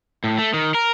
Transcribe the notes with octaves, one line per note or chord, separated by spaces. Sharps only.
A2
A3
D#3
A#4